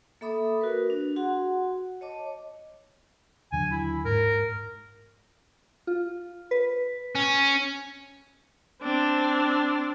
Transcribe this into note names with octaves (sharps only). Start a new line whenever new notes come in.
A#3 A4 E5 B5 D6 D#6
F#4 A#4 B4
D4
F#4 G#4 F#5 C6
C#5 D#5 A5 D6
D#2 D3 F#3 G#5
E4
G#2 A#4
F4
B4
C#4
C4 D4